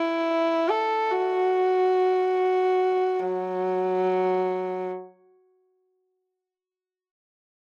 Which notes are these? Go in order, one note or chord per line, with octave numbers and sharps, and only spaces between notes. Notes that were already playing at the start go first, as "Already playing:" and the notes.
Already playing: E4
A4
F#4
F#3